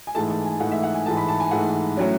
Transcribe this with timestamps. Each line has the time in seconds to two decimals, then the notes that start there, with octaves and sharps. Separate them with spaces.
0.07 G#5
0.15 G#2 E3 A3 A5
0.30 A5
0.45 G#5
0.60 G#2 E3 A3 F#5
0.72 E5
0.83 F#5
0.94 G#5
1.06 G#2 E3 A3 A5
1.17 B5
1.29 A5
1.40 G#5
1.51 G#2 E3 A3 F#5
1.97 A2 F#3 C#4